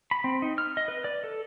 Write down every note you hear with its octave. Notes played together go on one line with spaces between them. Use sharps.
B5
C4
D#4
F6
D#5
B4
D5
A4